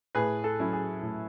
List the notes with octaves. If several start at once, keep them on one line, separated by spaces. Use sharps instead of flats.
A2 G#4 B4
A4
F#3 C#4 E4
G#4
A2